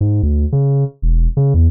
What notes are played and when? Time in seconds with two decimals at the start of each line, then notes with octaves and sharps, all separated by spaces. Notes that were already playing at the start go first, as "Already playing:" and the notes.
0.01 G#2
0.23 D2
0.52 C#3
1.02 E1
1.37 C#3
1.54 E2